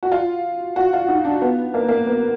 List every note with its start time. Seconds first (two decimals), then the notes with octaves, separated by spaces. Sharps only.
0.03 F#4
0.12 F4
0.76 F#4
0.93 F4
1.08 D#4
1.25 D4
1.42 B3
1.74 A#3
1.89 A#3
2.06 B3